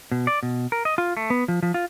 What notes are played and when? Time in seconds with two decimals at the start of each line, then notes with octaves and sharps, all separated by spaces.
0.12 B2
0.27 D5
0.43 B2
0.72 A#4
0.85 D#5
0.98 F4
1.17 A3
1.30 B3
1.48 F3
1.63 F3
1.74 F4